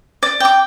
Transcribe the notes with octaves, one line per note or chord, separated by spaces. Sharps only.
D5
G5 D6